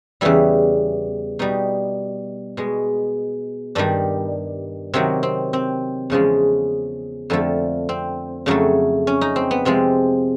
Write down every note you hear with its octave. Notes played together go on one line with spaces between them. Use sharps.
E2 C#3 E3 G3 E4
B2 G3 D#4
B2 G#3
G2 D#3 G3 D4
C3 D#3 F#3 C4
C4
C4
E2 C#3 F3 G#3
F2 D3 F3 A3
C4
F2 C#3 F#3 A3
C#4
D#4
C4
B3
C3 F3 G#3 C4